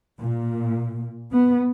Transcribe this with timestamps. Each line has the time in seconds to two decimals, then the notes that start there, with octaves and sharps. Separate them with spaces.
0.20 A#2
1.33 B3